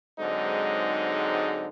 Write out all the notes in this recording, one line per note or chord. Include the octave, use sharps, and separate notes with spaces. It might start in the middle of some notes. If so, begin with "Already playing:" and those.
G#2 D3 F#3 G#3 C4 D#4